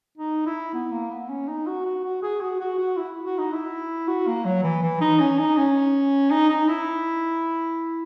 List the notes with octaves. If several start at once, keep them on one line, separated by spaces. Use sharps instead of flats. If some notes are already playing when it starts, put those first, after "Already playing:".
D#4
E4
B3
A#3
B3
C#4
D#4
F#4
F#4
F#4
G#4
F#4
F#4
F#4
E4
F#4
D#4
E4
F#4
A#3
F#3
E3
E3
D#4
C#4
D#4
C#4
D#4
D#4
E4